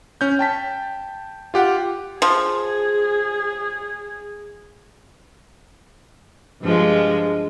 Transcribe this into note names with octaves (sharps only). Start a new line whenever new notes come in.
C#4 G6
G5 A5 B6
F4 G4 F#5
F3 G#4
G2 F3 G#3